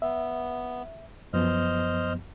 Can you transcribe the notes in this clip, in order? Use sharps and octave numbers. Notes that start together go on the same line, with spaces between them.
B3 E5
F#2 F3 B3 C5 D#5 F6